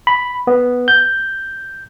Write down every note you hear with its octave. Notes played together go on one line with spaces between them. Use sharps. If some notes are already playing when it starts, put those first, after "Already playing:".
B5
B3
G6